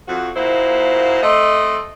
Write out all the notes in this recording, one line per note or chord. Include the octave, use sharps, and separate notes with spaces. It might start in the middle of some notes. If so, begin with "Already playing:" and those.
F2 F#4
A#2 A#3 E4 F#4 C5
A3 C4 D#5